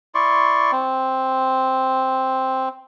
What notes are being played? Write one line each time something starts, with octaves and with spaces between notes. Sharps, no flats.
E4 D5 C6 C#6
C4